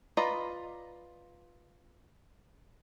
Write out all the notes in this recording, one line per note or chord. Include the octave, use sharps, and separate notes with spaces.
F4 B4 D5 D#5 A#5